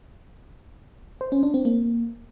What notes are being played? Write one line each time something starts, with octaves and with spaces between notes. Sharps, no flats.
C5
C#4
D4
C4
A#3